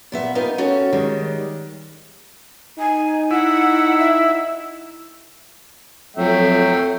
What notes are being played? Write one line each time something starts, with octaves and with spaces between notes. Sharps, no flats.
A#2 B3 E5
B3 D#4 F4 G4 A#4 B4
C#4 F#4 A4 C#5
D#3 G3 G#3
D#4 G#5
E4 F#5
E5
F2 F#3 A3 E5 G5